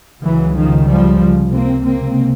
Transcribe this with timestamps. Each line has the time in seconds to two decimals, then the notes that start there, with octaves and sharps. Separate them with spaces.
0.22 C#2 C#3 E3 F#3
0.55 D#3 F3
0.87 F3 G3
1.51 C#2 C3 A#3 C4
1.84 A#3 C4